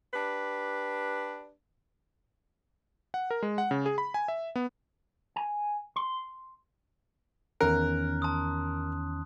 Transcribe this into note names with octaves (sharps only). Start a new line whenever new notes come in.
D4 G4 B4
F#5
A#4
G#3
F#5
C#3
G#4
B5
G#5
E5
B3
G#5
C6
E2 D#3 C#4 A#4 F#6
A5 C6 D#6